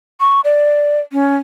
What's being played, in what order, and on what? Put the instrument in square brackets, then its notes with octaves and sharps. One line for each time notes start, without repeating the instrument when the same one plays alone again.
[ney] C#6
D5
C#4